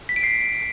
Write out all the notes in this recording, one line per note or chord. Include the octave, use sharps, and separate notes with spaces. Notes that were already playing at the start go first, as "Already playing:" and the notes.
B6
D7
C7